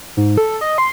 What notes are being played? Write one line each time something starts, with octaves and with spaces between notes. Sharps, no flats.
G#2
A4
D#5
C6